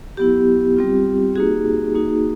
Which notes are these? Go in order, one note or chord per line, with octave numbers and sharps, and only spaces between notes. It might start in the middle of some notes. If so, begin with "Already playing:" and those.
F#3 B3 E4 G4
G3 C4 F4
A#3 D#4 F#4 G#4
A#3 D#4 F#4